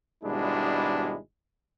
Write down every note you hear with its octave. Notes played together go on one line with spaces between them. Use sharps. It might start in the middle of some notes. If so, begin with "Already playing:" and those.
G#1 B2 G3 G#3 D4 E4